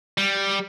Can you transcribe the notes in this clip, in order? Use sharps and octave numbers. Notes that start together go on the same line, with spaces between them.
G3